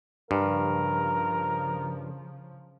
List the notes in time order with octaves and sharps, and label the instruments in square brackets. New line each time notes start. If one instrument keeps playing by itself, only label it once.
[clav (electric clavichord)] G2 [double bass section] C#3 F3 [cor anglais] A#4